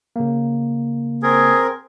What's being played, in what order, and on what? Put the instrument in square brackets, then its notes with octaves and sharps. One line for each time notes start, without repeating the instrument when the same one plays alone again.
[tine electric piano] C#3 A#3
[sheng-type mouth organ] C4 A#4 [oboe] G#4